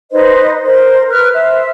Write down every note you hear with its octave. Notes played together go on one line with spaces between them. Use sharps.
D#4 B4 C5 D#5
A#4 C5
B4 F6 F#6
C5 E5